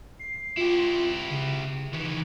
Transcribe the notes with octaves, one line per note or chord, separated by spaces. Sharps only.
C7
E4 F4 G4
C#3
D#3 E3